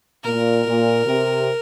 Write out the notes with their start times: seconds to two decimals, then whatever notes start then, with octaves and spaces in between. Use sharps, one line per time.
0.24 A#2 A#4
0.65 A#2
1.06 C3